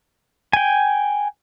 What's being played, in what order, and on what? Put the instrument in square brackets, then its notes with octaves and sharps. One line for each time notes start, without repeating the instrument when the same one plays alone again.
[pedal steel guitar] G5 G#5